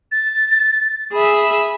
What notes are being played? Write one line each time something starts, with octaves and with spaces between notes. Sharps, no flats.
A6
G#4 E5 B5